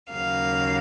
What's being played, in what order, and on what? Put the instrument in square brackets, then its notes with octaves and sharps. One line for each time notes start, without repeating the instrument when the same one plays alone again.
[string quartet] D#2 C#3 F#3 A#3 F5